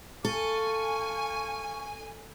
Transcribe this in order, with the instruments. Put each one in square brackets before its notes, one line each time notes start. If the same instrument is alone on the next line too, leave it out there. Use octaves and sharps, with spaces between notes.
[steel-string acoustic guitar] A4 [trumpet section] F5 C#6 [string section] G#5